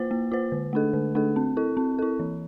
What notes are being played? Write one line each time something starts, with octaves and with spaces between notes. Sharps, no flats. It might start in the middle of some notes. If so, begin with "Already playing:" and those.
Already playing: A#3 F4 C5
A#3
F4 C5
D3
A3 D4 A4
D3
A3 D4 A4
C4
E4 A4
C4
E4 A4
E3